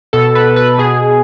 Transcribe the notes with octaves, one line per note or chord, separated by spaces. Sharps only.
B2 A4
B4
B4
B2 G#4